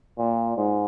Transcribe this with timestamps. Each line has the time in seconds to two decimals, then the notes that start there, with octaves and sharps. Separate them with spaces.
0.18 A#2
0.57 G#2